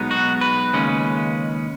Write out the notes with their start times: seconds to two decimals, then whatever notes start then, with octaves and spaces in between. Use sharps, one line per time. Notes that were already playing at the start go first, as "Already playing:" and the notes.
Already playing: B1 B2 G#3 B3 D#4
0.11 F#4
0.41 B4
0.73 D#2 C#3 G#3 C#4